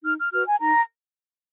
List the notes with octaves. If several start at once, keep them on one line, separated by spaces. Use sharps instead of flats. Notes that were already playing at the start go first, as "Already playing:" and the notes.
D#4 F6
F6
F#4 B4 F6
G#5
D#4 A#5